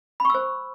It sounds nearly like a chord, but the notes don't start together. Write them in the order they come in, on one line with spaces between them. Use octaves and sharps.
B5 C#6 E6 C5